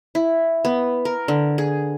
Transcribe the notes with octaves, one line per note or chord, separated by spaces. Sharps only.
E4
B3
A#4
D3
G#4